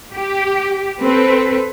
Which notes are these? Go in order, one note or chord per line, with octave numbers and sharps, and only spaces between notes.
G4
C4 A4 B4